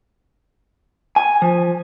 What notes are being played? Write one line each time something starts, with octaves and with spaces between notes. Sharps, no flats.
G#5
F3